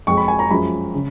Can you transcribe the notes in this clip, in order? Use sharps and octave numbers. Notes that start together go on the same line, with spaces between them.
F2 F3 G#3 C#6
B5
G#5
A#5
F#2 F3 G#3 B5
C#3